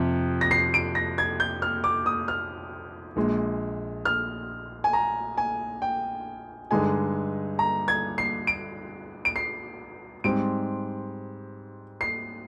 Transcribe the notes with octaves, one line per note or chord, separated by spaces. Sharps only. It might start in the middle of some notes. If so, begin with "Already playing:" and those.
Already playing: F2 C3 F3
A#6
C7
D7
A#6
G#6
G6
F6
D6
D#6
F6
A#1 A#2 G#3
F6
G#5
A#5
G#5
G5
G2 D3 G#3 D#4 G#5
A#5
G#6
C7
D7
D7
C7
G#2 G3 C4 D7
C7